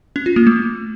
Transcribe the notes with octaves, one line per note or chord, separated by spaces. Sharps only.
C#4
F4
A#3
A3